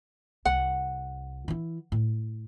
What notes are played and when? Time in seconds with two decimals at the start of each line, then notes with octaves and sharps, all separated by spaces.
0.45 C2 F#5
1.48 E3 E4
1.92 A2